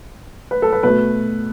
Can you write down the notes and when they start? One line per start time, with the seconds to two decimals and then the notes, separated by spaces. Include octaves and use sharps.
0.51 B4
0.62 A4
0.73 B4
0.83 B2 A3 B4